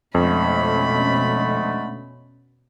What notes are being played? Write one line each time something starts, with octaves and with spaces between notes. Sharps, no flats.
F2 B2 D3 G#3 A3 C#4 B5